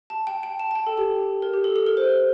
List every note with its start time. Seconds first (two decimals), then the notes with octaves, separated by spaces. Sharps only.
0.10 A5
0.27 G5
0.43 G5
0.60 A5
0.71 A5
0.75 G5
0.87 A4
0.98 G4
1.42 A#4
1.53 G4
1.64 A4
1.76 A4
1.86 A#4
1.97 C5